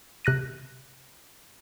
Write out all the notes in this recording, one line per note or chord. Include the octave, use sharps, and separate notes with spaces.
C3 F#6 A#6 D#7